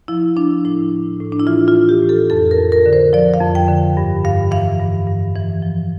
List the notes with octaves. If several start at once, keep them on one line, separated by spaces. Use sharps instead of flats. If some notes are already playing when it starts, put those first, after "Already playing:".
F3 E4
F3 D4
A2 E4
A2
A2
D4
E4
E3 F4
F4
E3
G4
A2
A4
F2 A4
A#4
F2
A#4
D3
C5
F3 D5
F5
F2
G5
D3
G2
G2 F5
E3 F5
G2
G2
E3
F3